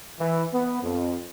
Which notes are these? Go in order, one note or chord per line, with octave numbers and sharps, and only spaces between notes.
E3
B3
F2